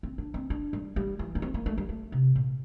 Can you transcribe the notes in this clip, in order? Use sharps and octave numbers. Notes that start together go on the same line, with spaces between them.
C4
D4
C4
D4
G3
G3
E3
A#3
C4
A#3
A3
G3
A3
C3
A#2